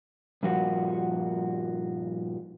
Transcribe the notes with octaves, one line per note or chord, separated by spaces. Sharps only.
G2 A#2 F3 F#4 F#5